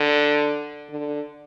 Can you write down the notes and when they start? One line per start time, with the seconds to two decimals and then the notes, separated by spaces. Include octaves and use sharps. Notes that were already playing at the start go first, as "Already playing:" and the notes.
Already playing: D3
0.90 D3